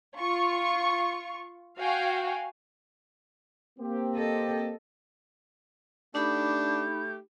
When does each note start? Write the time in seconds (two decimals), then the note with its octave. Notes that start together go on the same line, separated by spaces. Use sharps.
0.18 F4 C#6
1.78 F#4 F5 G5 G#5
3.79 A#3 C4 G4
4.15 A4 D#5
6.15 A3 D4 D#4 G4 B5 G6